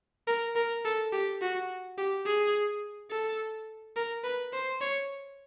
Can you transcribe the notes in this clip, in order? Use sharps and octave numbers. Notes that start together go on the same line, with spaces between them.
A#4
A#4
A4
G4
F#4
G4
G#4
A4
A#4
B4
C5
C#5